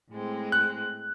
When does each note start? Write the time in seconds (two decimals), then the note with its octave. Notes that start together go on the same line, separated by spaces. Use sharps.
0.11 A2 G#3 C4
0.52 F#6